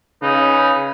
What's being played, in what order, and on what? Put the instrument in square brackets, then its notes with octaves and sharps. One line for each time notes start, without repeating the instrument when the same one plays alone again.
[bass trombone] C#3 [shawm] D#4 [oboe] B4